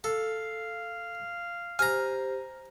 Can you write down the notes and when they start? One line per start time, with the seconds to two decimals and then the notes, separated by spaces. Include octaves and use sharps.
0.04 A4 F5
1.79 G4 C5 G#5 A#5 F6